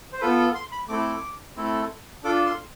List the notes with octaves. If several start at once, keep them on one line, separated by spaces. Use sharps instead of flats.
C5
B3 F4 A4 B4
C6
B5
A3 C4 E4 A4 D6
A3 C4 E4 A4
D4 F4 A4 D6
C6